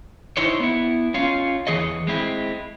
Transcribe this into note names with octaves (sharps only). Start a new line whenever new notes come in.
D#4 E4 C5 C#5
B3 E4
C#4 F4
E2 E3 G#4 C#5 D#5
G#3 C4 E4